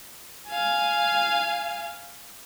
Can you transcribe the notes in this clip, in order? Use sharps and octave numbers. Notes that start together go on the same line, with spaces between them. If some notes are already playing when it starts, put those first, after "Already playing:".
F5 G#5